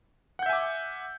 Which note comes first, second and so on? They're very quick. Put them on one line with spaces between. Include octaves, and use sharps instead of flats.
F#5 G6 E5 G#5 D6